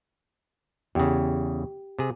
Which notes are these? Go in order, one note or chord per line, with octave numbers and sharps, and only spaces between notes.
E2 C#3 G4
C3 G#4